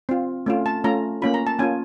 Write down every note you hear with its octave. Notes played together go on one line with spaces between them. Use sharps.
C4 F4
A3 C#4 F4
A5
A3 C#4 F4 A#5
A#3 C#4 F4 B5
A#5
A5
A#3 C#4 F4 G#5